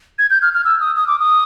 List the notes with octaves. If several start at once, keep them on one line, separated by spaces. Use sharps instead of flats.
G#6
G6
F6
F6
E6
D#6
D#6
D6
D#6